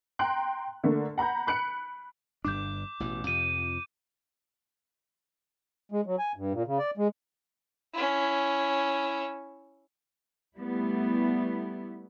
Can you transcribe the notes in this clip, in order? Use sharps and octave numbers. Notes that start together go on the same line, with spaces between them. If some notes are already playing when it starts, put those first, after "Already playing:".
G5 A#5 C6 F#6
D3 A3 A#3
F#5 A#5 B5 G6
B5 F#6 C#7 D7
G1 G2 D4 D6 G6
A1 B2 E3
F2 C3 F3 D#7
G#3
F#3
G#5
G2
A#2
C#3
D5
G#3
C#4 E4
G3 A3 B3 E4